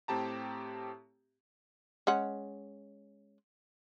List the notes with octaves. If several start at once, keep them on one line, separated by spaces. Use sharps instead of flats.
A2 C4 G4 A5 A#5
G#3 C#4 F#5